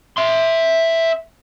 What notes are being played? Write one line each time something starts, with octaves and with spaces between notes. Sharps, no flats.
E5 C6